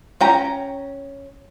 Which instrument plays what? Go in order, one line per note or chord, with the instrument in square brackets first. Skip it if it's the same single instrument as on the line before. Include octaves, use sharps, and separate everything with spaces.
[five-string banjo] C#4 G5 A#5